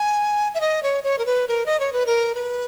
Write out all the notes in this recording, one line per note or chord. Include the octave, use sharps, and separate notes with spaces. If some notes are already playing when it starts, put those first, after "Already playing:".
Already playing: G#5
E5
D#5
C#5
C#5
A#4
B4
A#4
D#5
C#5
B4
A#4
B4